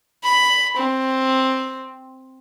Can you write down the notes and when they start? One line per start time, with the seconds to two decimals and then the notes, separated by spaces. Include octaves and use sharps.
0.24 B5
0.77 C4